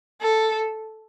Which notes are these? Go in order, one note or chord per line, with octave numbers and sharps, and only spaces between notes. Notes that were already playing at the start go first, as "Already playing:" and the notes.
A4